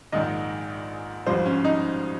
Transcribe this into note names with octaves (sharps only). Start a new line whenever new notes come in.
A#1 G#2 D#3 D#5
G#1 G2 F3 C5
C#4
D#4